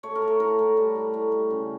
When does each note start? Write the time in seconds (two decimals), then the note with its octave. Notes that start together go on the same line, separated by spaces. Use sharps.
0.03 A3 C#5
0.15 A#4
0.22 A3
0.28 A4
0.40 A2 A#4
0.59 A2
0.77 G3
0.95 A2
1.14 A2
1.32 G3
1.50 C#3